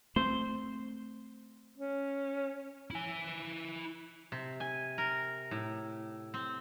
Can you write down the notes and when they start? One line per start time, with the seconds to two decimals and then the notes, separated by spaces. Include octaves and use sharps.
0.16 A3 C4 C5
1.77 C#4
2.91 E4 G#5
4.32 C3
4.60 G#5
4.98 A#4
5.51 A2
6.34 C4